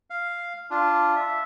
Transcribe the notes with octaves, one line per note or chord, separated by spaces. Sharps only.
F5
D4 F4
E5